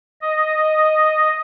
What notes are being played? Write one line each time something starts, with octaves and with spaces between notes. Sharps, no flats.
D#5